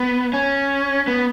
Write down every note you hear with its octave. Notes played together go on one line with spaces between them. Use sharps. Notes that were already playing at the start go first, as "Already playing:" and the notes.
Already playing: B3
C#4
B3